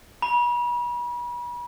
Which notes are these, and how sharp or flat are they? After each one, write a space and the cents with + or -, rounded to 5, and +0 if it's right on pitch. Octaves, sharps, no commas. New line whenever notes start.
B5 -40